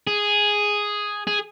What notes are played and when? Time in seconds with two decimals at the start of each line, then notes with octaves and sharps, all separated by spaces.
0.07 G#4
1.27 G#4